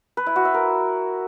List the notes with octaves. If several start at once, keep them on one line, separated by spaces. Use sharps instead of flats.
B4
E4
F#4
E5
A#4